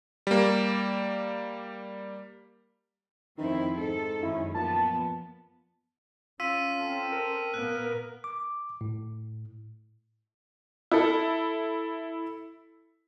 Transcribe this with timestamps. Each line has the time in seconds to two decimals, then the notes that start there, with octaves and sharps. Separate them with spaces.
0.27 G3 A#3
3.38 F2 D#3 C4 E4
3.78 G#2 A4
4.23 F#2 D#3 C#4 E4
4.54 A#2 F3 B3 A5
6.40 C#4 F4 E6 B6 D#7
6.78 C4 A4
7.12 A#4
7.54 A#2 A#3 B3 F#6
8.24 D6
8.81 A2
10.91 E4 A4